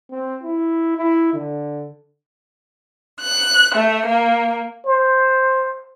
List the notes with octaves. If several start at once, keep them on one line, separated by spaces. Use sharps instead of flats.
C4
E4
E4
D3
F#6
A3
A#3
C5